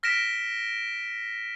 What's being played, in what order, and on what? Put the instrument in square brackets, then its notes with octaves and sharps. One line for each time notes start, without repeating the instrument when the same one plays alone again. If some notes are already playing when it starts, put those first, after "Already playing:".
[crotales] F6 A#6 B6 D7 E7